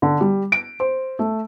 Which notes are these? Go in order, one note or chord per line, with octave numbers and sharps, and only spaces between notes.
D3
G3
D7
C5
A3